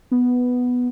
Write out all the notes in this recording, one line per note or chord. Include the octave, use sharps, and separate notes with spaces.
B3